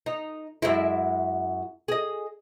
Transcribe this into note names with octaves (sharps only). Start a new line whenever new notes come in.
D#4
F#2 G#3 E4
G#4 D#5